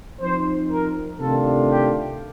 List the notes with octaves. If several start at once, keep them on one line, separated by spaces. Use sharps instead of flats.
F3 C4 D#4 C5
A#4
C3 D#3 A3 D4 F4 A4
G4